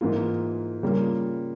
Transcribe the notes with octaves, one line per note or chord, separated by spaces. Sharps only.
G#2 E3 A#3 F4
C#3 G3 A#3 F4